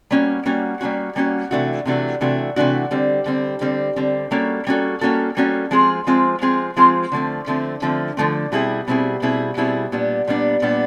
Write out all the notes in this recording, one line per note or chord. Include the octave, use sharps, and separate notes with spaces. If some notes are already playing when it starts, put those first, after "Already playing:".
G3 A#3 C#4 F#4
G3 A#3 C#4 F#4
G3 A#3 C#4 F#4
G3 A#3 C#4 F#4
C3 E3 A3 D4 F#4
C3 E3 A3 D4 F#4
C3 E3 A3 D4 F#4
C3 E3 A3 D4 F#4
D3 G3 C4
D3 G3 C4
D3 G3 C4
D3 G3 C4
G3 A#3 C#4 F#4 A4
G3 A#3 C#4 F#4 A4
G3 A#3 C#4 F#4 A4
G3 A#3 C#4 F#4 A4
F3 G#3 C4 F4 G#4
F3 G#3 C4 F4 G#4
F3 G#3 C4 F4 G#4
F3 G#3 C4 F4 G#4
D3 F3 A3 C4
D3 F3 A3 C4
D3 F3 A3 C4
D3 F3 A3 C4
B2 G3 C4 E4 G#4
B2 G3 C4 E4 G#4
B2 G3 C4 E4 G#4
B2 G3 C4 E4 G#4
A#2 G3 B3 D4
A#2 G3 B3 D4
A#2 G3 B3 D4